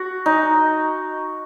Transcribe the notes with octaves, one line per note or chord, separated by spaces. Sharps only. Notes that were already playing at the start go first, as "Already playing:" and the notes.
Already playing: F#4
D#4